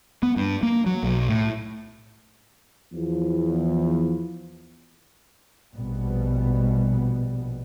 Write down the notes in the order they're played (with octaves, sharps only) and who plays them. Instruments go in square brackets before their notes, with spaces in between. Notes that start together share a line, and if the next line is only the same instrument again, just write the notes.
[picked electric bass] B3
G2
A#3
F#3
B1
A2
[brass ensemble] E2 F3
[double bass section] A#1 B2 G3 B3